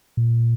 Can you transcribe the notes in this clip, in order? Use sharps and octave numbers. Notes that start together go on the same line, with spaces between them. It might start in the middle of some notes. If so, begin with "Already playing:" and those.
A#2